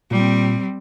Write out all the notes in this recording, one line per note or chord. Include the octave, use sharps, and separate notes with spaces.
A#2 G3 C4